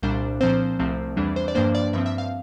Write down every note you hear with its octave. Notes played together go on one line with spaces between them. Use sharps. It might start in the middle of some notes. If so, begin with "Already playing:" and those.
C2 A#2 G3 D4 C5
A#2 F3 C4 C5
C2 C3 F3 A3 C4
E2 E3 G3 D4
C5
D5
G2 F3 A#3 D4 C5
D5
G2 F3 C4 E5
E5
F5